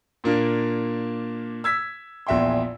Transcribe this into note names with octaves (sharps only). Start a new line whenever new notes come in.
A#2 A#3 D4
E6 G#6 B6
A#1 E2 E5 G5 C6